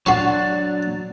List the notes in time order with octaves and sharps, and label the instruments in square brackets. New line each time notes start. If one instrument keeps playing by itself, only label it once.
[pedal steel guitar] F#3 D4 [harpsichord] F#4 C6 C#6